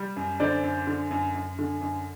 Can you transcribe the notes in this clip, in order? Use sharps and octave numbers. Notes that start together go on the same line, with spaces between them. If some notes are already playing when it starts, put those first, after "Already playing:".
Already playing: G3
F#2
D3 C5 D5
F#2
D3
F#2
F#2
D3
F#2